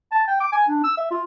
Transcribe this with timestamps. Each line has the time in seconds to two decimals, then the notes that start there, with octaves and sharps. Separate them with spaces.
0.12 A5
0.28 G5
0.40 D6
0.52 G#5
0.68 D4
0.84 E6
0.97 E5
1.11 F4